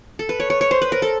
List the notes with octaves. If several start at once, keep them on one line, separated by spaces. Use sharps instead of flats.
A4
B4
C#5
C#5
C#5
C5
B4
A#4
A4